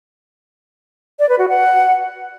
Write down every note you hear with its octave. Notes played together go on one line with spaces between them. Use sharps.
D5
B4
F#4
F#5